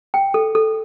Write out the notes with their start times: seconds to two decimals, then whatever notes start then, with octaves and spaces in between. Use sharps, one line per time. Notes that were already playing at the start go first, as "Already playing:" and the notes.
0.14 G5
0.34 A4
0.55 A4